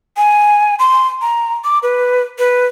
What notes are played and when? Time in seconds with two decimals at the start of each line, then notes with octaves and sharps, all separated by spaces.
0.17 G#5
0.79 C6
1.21 A#5
1.64 D6
1.83 B4
2.38 B4